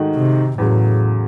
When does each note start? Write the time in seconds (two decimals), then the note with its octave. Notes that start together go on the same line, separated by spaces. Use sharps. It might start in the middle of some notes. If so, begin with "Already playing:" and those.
Already playing: G#2 D#3 A3 D#4 F#4
0.16 C3
0.58 E2 A2 C#3 F#3